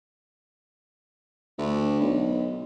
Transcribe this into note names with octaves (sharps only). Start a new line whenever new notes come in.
D2
B1